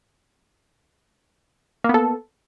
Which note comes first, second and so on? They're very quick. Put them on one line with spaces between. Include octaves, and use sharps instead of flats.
A#3 B3 A4